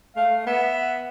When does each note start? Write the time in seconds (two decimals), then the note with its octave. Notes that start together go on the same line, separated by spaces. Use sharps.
0.17 A3 F5
0.47 B3 E5